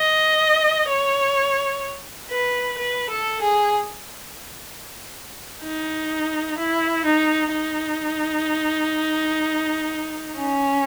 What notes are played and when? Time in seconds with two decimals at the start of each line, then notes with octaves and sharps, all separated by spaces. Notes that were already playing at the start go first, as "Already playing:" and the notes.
Already playing: D#5
0.88 C#5
2.31 B4
2.78 B4
3.10 A4
3.41 G#4
5.63 D#4
6.58 E4
7.05 D#4
7.52 D#4
10.37 C#4